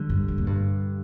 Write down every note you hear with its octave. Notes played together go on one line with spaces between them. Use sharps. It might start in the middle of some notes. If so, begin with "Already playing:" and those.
Already playing: D3 G3
G2
G2
A#2
G2